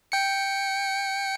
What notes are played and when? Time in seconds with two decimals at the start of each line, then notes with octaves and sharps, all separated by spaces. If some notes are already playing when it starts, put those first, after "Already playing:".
0.12 G5 C#7